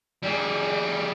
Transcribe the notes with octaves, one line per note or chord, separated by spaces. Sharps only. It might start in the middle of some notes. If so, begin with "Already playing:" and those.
G3 G#4